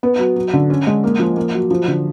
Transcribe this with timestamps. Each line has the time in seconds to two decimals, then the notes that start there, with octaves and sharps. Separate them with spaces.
0.03 B3
0.19 F#3
0.36 F#3
0.53 D3
0.70 C#4
0.87 G#3
1.04 A#3
1.19 F3
1.37 A#3
1.54 F#3
1.71 F3
1.88 D3